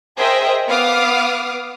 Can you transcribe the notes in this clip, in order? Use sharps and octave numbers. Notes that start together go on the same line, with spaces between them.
G#4 A#4 C5 D#5 E5 G5
B3 F5 D6 D#6 F6